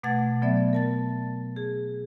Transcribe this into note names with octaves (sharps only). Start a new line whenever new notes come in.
B2 A3 F#5 A5 G#6 A6
F#3 B3 D5 E5
A#4 A5 A6
G#4